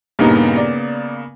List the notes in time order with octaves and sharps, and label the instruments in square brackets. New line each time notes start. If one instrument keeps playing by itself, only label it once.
[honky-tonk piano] G2 A#2 D#4 [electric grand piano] C#3 A#3 B3
[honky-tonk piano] D5